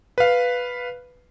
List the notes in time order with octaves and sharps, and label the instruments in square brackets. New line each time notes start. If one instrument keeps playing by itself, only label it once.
[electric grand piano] B4 F5